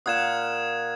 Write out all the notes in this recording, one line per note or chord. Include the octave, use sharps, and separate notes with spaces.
A#2 F5 F#5 D#6 G#6 E7